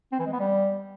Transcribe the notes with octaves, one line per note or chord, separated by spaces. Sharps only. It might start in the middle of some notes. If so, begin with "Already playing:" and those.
C4
E3
G#3
B3
G3